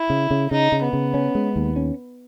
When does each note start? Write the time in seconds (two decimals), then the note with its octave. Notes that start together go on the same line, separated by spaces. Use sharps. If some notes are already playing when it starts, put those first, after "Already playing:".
Already playing: E4
0.10 C#3
0.31 C#3
0.51 C#3 D#4
0.72 C#3
0.83 B3
0.93 C#3
1.14 C#4
1.35 G#3
1.56 D#2
1.76 C#4